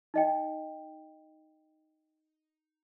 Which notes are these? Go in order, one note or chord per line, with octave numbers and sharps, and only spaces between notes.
D#4 D#5 G5